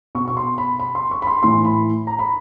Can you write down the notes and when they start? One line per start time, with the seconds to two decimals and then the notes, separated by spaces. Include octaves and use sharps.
0.15 B2 C#6
0.28 C#6
0.37 C6
0.58 B5
0.80 B5
0.95 C6
1.11 C#6
1.22 B5
1.27 C6
1.43 A2 E3 C6
1.65 B5
2.07 A#5
2.19 B5